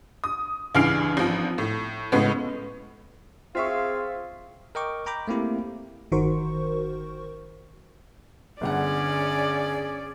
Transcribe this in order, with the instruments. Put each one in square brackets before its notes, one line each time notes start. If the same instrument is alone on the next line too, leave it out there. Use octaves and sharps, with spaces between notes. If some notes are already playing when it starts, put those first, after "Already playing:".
[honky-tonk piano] D#6
C#2 G2 E3 F6 C7 D7
G#1 F3
A2
A2 C#3 G#3 B3
[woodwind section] C4 G#4 F5 [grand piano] F4 E5 C#6
[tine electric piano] A#4 D#5 G5 C#6 D6
G5 A#5 B5 D6 G6
A3 A#3 C4 E4 G4
[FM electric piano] G1 D#3 F#4 A#4 C5 C#6
[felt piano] G1 D3 F#5 [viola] C#4 D5 [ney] G#4